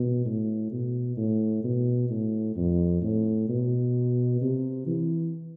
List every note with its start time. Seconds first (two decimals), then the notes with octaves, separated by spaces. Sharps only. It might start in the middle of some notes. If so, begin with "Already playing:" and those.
Already playing: B2
0.25 A2
0.72 B2
1.17 A2
1.64 B2
2.10 A2
2.56 F2
3.02 A2
3.49 B2
4.41 C3
4.87 E3